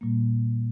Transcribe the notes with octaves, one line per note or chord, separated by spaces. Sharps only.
A#2 G3 A#3